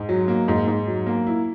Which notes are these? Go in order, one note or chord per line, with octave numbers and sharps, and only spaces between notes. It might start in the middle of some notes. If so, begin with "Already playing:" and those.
Already playing: G#2
F#3
A#3
G#2
G#2
F#3
A#3
E4